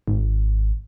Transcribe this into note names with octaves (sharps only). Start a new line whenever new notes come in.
G#1